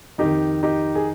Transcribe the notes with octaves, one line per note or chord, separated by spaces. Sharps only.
F2 D#3 D#4 G4
D#4 G4
G#4